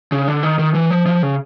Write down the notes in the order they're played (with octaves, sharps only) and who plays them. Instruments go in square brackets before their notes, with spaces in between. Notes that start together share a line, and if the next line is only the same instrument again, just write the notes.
[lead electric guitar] C#3
D3
D#3
D#3
E3
F3
F3
C#3